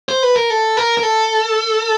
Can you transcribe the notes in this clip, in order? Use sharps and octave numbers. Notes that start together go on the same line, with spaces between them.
C5
B4
A#4
A4
A#4
A#4
A4